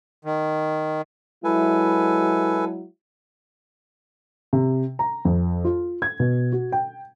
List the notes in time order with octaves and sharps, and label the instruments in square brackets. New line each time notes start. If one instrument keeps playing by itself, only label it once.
[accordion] D#3
[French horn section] F#3 G#3 E4 [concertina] A4 B4 G#5
[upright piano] C3
A#5
F2
F4
G#6
B2
F#4
G5